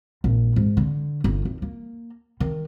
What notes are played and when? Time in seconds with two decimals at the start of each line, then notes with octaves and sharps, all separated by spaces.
0.24 A#1
0.56 G#2
0.77 D3
1.24 G1
1.45 D#2
1.62 A#3
2.40 D#3